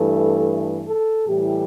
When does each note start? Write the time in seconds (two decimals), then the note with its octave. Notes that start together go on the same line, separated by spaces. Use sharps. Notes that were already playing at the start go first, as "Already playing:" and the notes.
Already playing: G2 E3 A3 A4
0.84 A4
1.26 A2 E3 G3 G4